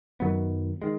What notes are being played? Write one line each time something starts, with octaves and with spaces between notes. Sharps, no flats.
F#2 D#3 F#3 B3
D#3 G#3